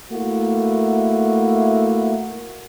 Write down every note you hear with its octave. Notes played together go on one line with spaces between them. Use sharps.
A3 A#3 E4 F#4